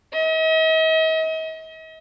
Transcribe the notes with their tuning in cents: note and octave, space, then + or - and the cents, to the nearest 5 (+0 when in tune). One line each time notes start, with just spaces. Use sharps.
D#5 +45